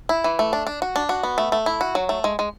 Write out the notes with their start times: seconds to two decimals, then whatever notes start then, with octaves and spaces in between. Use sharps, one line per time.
0.09 E4
0.24 E3
0.39 A3
0.53 D4
0.67 D4
0.82 F#4
0.96 D4
1.09 F#4
1.23 B3
1.38 A3
1.52 A3
1.66 E4
1.81 F#4
1.95 F#3
2.09 A3
2.24 G#3
2.39 G#3